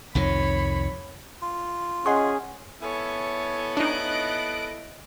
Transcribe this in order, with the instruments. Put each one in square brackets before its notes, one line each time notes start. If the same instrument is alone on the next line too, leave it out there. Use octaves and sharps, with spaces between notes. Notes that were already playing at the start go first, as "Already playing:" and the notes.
[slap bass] C2 F2 D#3 [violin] C#5 B5
[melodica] F4
[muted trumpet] C#4 [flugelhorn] G#4 [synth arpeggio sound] D#5 F#5 C6
[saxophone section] B3 E4 A4 [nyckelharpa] C#5 G#5
[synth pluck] D4 D#4 [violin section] D#5 F#6 D7